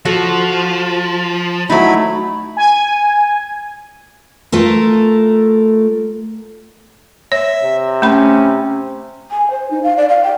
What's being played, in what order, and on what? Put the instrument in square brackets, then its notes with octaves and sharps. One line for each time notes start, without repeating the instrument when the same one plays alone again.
[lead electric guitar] F3 [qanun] F#4 A4
[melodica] F#3 E4 B5 [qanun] A3 D#4
[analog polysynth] G#5
[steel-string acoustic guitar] A3 F4 A4 A#4
[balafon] C#5 [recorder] E5
[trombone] C3
[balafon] A3 B5 [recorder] C#4
[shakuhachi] G#5
C5
D#4
F5
D5
F5
G5